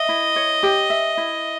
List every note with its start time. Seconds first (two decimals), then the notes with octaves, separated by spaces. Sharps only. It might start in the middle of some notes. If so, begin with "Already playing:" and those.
Already playing: D#5 E5
0.09 E4
0.36 C#5
0.63 G4
0.90 E5
1.17 E4